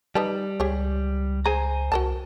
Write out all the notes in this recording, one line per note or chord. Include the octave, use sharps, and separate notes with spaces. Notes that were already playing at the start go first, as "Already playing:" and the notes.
G3 D#4 B4 A5
C#2 G4 G#4 C#5
G#4 C5 G#5 A#5
C2 F#4 A#4 A5